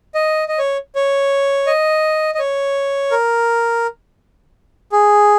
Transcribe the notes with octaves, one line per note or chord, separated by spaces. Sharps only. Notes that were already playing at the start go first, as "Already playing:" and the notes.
D#5
D#5
C#5
C#5
D#5
D#5
C#5
A#4
G#4